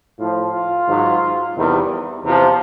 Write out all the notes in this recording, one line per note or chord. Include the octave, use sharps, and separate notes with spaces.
A2 F3 F4
F4
G#2 D#3 F#3
E2 C3 D#3 G3
E2 C3 F3